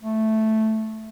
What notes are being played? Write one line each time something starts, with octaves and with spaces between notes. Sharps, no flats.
A3